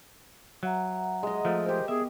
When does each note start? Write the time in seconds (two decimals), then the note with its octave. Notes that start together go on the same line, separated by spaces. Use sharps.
0.63 F#3 E5 F#5 A#5
1.23 G#3 D#5
1.45 F3 A3
1.66 G4 A#4 C5
1.88 B3 G#4 E5